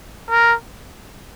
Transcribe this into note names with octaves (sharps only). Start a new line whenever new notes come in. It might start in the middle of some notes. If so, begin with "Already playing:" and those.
A#4